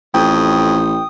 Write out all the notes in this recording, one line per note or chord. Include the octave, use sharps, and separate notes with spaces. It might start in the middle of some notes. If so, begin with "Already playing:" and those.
A1 F2 G5 D#6